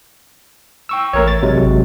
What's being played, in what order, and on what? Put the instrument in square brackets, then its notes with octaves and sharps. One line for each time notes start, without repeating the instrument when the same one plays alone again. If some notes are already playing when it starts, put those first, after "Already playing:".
[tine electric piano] G5 C#6 E6
[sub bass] A1 [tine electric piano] A3 A#4 C#5
[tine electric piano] A6
C3 F#3 G#3
[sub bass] G#1